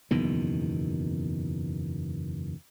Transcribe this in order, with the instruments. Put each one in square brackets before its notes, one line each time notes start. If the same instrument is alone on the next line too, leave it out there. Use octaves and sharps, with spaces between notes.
[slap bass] F#1 E2 B2 D#3